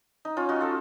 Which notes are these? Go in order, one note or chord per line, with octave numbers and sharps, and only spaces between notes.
D#4
C#4 F4
D#4 F#4
F4 A4